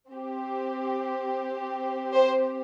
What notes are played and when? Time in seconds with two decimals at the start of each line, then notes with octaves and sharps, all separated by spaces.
0.10 C4 G4
2.15 C5